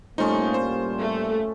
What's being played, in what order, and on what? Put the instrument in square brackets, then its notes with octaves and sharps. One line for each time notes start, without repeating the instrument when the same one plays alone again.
[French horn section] A2 G3 A#3 [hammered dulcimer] F3 C#4 [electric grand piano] A3 D#4
[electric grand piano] C5
[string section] A3